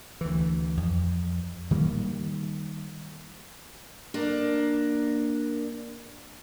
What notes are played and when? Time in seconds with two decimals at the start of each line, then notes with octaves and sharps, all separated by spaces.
0.21 D2 E3
0.77 F2
1.71 D#3 G3 A#3
4.14 A#3 D4